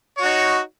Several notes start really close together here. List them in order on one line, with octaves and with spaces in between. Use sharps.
C#5 F#4 D#4